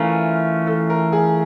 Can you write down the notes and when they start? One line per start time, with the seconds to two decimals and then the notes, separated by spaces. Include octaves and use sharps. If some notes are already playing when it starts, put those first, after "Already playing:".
Already playing: E3 A3 C#4 F4 A#4
0.67 A4
0.90 A#4
1.13 G#4